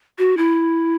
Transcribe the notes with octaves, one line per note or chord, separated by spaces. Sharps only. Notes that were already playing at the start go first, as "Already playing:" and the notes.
F#4
E4